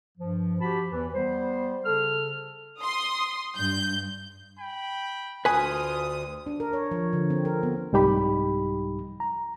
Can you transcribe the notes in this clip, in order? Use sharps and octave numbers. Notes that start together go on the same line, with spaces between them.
G2 F3
F3 F#4 G4 A5 B5
E2 E3
G3 B3 C5
C#3 A4 F6
C6 D#6
G2 G6
G5 B5
D2 F4 B4 G#5 D#6
D4
A#4
C#5
F3
D3
C4
A#4
B3
C2 G#2 G3 D#4 G4 B5
A#5